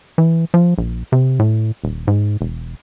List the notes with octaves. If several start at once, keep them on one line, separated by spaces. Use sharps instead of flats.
E3
F3
A#1
C3
A2
D#1
G#2
E1